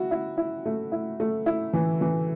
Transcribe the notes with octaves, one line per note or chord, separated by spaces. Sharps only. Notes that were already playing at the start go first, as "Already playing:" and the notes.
Already playing: E4 F#4
E4
E4
A3
E4
A3
E4
E3
E3